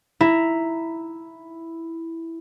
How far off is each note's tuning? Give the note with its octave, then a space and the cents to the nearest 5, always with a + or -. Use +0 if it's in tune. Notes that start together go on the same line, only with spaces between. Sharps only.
E4 +0 A#5 +0